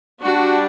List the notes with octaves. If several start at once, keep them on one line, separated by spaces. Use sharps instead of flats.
G3 D4 F#4